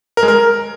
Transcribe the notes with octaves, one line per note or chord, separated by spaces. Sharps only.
A#4
G#3
A#4